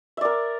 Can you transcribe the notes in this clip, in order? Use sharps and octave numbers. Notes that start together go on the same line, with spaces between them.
A#4 D5 E5